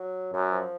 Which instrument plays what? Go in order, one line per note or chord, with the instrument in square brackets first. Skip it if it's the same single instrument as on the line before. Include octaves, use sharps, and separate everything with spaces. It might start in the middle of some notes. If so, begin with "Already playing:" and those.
Already playing: [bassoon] F#3
[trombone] F#2 [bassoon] F#3
[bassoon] F3